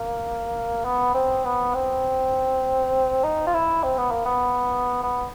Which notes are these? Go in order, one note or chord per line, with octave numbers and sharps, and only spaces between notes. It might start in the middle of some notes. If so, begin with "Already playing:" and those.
Already playing: A#3
B3
C4
B3
C4
D#4
F4
E4
C4
B3
A#3
B3
B3